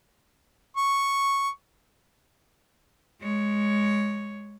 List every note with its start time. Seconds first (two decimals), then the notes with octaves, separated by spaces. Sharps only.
0.77 C#6
3.20 G#3 C#5